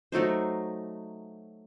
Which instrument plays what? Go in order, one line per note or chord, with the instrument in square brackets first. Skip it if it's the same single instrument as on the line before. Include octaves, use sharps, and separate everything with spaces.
[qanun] F#3 A3 D#4 C5